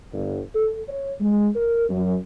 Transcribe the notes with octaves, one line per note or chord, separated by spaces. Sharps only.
G1
A4
C#5
G#3
A#4
F#2